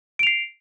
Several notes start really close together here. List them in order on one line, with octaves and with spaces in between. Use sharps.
D7 F7 C7